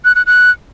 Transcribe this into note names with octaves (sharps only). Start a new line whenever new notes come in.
F#6
F#6
F#6